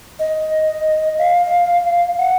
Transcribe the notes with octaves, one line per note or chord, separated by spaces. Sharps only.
D#5
F5
F#5